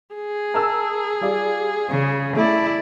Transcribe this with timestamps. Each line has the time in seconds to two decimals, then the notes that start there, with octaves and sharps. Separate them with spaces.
0.16 G#4
0.54 A#4 A5 E6
1.21 G3 F4 D5
1.90 C#3
2.36 A3 E4 D5